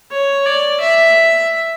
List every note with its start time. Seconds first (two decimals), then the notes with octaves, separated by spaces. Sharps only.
0.11 C#5
0.46 D5
0.81 E5